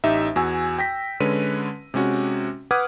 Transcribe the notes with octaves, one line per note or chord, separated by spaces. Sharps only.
A1 D#4 G4 E5
E2 F#4 G#5 E6
G5 A#6 B6
D3 G#3 C#4 B4 C#5 D#7
C3 G#3 C#4 F#4
B4 F#5 D6 D#6 F6 G#6